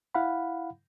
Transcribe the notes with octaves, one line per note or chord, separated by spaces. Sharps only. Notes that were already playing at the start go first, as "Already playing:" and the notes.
E4 F5 F#5 B5